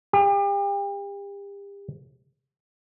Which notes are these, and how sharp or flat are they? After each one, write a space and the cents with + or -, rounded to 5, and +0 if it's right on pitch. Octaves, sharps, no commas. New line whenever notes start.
G4 +35